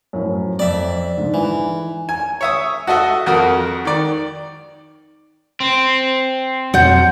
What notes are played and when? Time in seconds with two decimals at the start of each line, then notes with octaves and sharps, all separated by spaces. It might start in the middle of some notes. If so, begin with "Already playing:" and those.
0.13 F#2 A2 F3
0.59 F2 D5 E5
1.17 G#2 D3
1.34 E3
2.09 G#5
2.41 C#5 E5 D#6
2.87 F#4 A4 D#5 E5
3.26 F2 F#4 A#4 D#6
3.85 D#3 D5
5.60 C4
6.74 F2 B2 F#3 F#5 A5 G6